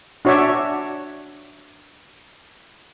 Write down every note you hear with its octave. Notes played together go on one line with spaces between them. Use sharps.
D4 F#4 C#5 D5 E5